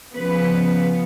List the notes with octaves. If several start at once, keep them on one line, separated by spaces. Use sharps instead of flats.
C#3 F3 B3 B4